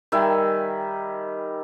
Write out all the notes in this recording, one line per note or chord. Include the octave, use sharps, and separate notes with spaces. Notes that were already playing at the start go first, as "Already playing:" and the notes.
D#3 G3 E5 G#5